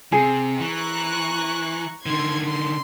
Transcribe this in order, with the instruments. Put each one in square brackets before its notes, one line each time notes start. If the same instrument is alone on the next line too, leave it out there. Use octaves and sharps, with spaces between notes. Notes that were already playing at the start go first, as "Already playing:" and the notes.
[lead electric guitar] C3 [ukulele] G#4
[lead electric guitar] E3 [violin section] A#5 C#6 F#6
[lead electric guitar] D3 D#3 [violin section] C6 G#6
[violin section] C6